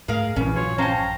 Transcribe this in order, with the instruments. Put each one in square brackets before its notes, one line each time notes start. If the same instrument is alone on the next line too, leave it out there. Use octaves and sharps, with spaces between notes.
[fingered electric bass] G#2 A3 [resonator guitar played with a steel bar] G#4 A#4 F5
[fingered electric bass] A#1 G2 F3 [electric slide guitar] C#3 E3 [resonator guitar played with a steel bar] C#4
[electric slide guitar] F#3 F4 [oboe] C#5
[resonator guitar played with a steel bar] C#4 A5 [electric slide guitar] C5 F5 G5 [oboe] A#5